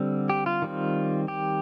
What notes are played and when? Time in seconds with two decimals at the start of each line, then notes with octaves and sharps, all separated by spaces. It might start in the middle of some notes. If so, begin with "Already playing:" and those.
Already playing: D3 G3 C4
0.30 G4
0.46 F4
0.62 D#3 G3 C4
1.28 G4